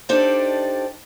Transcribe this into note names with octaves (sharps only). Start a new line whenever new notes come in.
D4 D#4 G4 A4 C5 D5